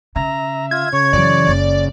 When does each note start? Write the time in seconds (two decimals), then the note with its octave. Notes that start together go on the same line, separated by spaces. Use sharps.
0.16 C#3 E5 A#5
0.71 F4 G#6
0.93 C#3 C#5
1.13 F#2 E3 D5
1.47 F#1 D5